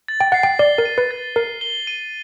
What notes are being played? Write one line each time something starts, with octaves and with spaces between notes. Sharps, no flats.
A6
G5
F#5 C7
G5
D5 G7
A#4
D#7
B4
A6
A#4 C7
G7
D#7